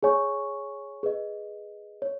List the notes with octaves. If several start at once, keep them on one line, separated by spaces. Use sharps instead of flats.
G#4 C#5 G#5 C#6
G#4 B4 D#5
C#5